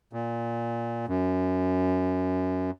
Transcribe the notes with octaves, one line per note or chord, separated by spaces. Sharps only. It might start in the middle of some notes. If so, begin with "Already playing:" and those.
A#2
F#2